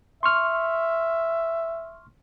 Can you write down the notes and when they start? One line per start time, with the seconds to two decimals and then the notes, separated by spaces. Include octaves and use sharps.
0.23 E5 C6 C#6 F6